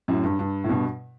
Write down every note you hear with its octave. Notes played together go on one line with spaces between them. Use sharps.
F#2 A2
G2
G2
A2
G2 B2